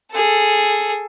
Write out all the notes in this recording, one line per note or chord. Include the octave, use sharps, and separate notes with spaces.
G#4 A4